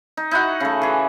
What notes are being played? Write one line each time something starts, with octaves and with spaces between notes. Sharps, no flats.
D#4
D#4 E4 F#4 F#5
C#3 A3
E3 G#4